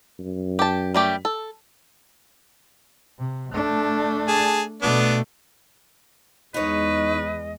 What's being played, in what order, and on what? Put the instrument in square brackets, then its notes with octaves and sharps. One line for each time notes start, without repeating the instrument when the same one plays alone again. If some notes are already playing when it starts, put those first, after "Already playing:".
[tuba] F#2
[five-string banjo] G4 A5
G3 A3 G4
A4
[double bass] C3
A3 D4
[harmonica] G#4 A5
[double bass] B2 A3 [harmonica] B3 D4
[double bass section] E2 G#3 [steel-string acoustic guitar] D#4 C#5 [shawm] B4 [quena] D#5